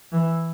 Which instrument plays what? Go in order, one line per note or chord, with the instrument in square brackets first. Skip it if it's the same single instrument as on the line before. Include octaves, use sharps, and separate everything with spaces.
[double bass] E3